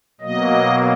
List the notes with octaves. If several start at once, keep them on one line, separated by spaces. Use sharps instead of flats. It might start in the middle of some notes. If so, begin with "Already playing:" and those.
B2 F#3 A#3 D#5